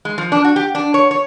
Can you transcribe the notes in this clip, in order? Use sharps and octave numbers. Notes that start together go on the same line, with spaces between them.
G#3
F3
D4
F#4
G4
D4
C#5
C#5